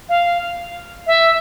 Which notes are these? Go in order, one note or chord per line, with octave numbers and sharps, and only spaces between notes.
F5
E5